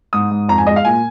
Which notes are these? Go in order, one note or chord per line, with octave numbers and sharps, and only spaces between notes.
G#2 D#6
G#2
F2 A#5
G#5
G#3 D#5
F5
A#2 G#5